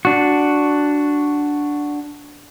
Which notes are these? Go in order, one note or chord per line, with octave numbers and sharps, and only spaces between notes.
D4 F#4